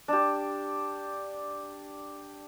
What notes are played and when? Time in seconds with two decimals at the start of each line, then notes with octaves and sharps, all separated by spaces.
0.08 D4 G4